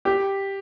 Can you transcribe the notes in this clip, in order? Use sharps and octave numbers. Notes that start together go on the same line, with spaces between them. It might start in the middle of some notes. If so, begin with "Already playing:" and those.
G4